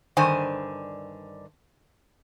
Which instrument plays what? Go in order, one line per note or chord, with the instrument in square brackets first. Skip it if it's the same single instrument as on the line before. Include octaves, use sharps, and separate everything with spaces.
[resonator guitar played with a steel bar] G2 D3 D#3 C5 G#5